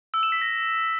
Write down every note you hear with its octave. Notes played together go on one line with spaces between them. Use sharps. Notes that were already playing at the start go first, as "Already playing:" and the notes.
E6
E7
B6
A#6